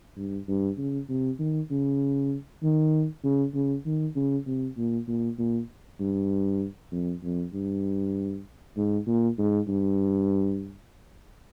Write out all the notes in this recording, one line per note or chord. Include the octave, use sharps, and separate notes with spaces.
G2
G2
C#3
C3
D#3
C#3
D#3
C#3
C#3
D#3
C#3
C3
A#2
A#2
A#2
G2
F2
F2
G2
G#2
A#2
G#2
G2